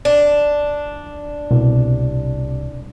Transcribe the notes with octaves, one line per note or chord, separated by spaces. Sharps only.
D4
C2 B2